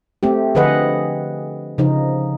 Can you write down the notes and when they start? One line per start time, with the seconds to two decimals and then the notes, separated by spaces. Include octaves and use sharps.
0.23 A3 C4 G4
0.55 D3 F3 G#4 B4 D#5 F#5
1.78 C#3 F3 D#4